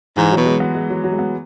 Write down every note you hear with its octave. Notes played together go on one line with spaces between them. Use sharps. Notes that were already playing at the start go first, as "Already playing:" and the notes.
G#2 E3
B2 F#3
G#3
B3
G#3
F#3
F#3
G#3
B3